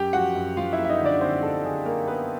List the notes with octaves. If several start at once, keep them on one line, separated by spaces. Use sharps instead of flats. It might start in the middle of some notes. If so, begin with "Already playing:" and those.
Already playing: F#2 G4 G5
F3 F#4 F#5
F#2
F3 F4 F5
E4 E5
A#3
E5
D#4 D#5
D3
D4 D5
D3 C4 C5
F#2 A4
D3 G#4
A#3 A#4
A#3 B3 B4